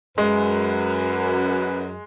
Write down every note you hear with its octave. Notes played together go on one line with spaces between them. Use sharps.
F#2 G#3 B4